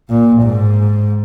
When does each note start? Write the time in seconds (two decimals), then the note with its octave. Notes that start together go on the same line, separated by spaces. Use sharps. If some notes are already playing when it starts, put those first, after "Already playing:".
0.09 A#2
0.42 G#2